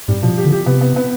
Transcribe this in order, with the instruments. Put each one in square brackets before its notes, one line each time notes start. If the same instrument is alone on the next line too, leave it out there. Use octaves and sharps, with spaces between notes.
[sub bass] G#2 [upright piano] G3
[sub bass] B2 [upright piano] F3
[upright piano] G4
[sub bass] D3
[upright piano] G4
[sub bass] C3 [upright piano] B3
[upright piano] B3
B3